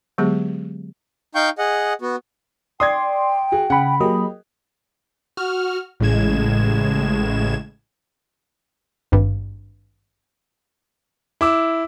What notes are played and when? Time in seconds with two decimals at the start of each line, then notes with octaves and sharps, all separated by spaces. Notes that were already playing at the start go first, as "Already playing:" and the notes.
0.18 D3 F#3 G#3 B3 G4 G#4
1.35 D#4 F5 G5 C#6 G6
1.58 G#4 D#5 F#5
2.02 B3 F#4
2.80 D5 G5 C6 D#6 G#6
3.52 F#4 G#4
3.70 C#3 F#5 B5
4.00 F#3 A#3 G4 G#4 D#5 B5
5.37 F#4 F6
6.00 A1 A2 C#3 G#3 G#6 E7
9.12 G#1 G2
11.41 E4 D6 E6